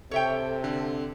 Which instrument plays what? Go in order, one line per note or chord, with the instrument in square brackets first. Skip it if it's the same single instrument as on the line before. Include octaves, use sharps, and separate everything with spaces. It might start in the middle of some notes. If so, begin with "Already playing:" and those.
[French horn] C3 [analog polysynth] A4 [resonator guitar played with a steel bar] C#5 E5 G5
[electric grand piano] D3 C4